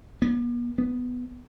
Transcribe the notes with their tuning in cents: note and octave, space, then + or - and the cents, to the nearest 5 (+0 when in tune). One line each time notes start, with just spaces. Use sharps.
B3 -45
B3 +5